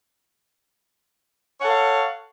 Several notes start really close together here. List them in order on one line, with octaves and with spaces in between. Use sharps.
C#5 F#5 A4 F5